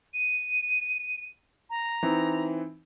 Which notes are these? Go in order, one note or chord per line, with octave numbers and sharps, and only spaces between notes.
D#7
A#5
E3 C4 D#4